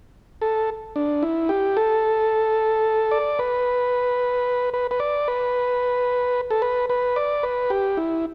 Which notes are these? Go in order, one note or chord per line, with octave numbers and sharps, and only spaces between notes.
A4
D4
E4
G4
A4
D5
B4
B4
B4
D5
B4
A4
B4
B4
D5
B4
G4
E4